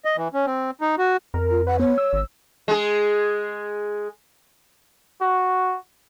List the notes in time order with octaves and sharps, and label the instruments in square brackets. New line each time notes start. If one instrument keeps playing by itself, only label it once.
[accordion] D#5
E3
C#4
C4
D#4
F#4
[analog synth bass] F2 [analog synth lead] A#4
[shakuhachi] F4
[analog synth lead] B4 [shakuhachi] F#5
[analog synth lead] B3 [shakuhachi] C#5
[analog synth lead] E6
[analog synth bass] G#1
[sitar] G#3 G#4
[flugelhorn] F#4